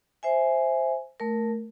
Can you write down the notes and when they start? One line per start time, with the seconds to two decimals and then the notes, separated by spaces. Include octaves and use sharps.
0.23 C5 E5 G#5
1.20 A3 A#4